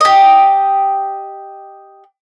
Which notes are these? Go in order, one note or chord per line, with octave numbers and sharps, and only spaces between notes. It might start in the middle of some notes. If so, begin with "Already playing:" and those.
G4 D#5